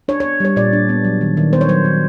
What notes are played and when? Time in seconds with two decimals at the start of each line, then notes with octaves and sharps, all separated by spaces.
0.08 D4 C#5
0.20 B3 C#5
0.40 G3 C#5
0.56 A#2 D5
0.73 D4
0.89 B3
1.05 F#3
1.21 D#3
1.37 D#3
1.52 B3 C5
1.61 C#5
1.69 F#3 C5
1.85 D#3